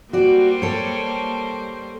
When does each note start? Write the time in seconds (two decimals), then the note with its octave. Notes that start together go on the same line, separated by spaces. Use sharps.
0.13 G3 A#3 F#4 C5 D5
0.62 A4 C#5